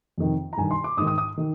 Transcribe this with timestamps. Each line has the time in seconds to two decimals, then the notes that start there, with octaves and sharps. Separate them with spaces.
0.18 F2 C3 D#3
0.53 A#5
0.57 G2 D#3 G#5
0.71 C6
0.84 D6
0.97 G#2 D#6
1.02 D#3
1.07 D#6
1.18 D#6
1.37 D#3